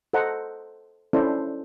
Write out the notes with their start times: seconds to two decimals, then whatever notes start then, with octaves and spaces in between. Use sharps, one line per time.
0.13 A4 C5 D#5 F#5 A#5
1.13 C#4 D4 E4 A4 C5 D5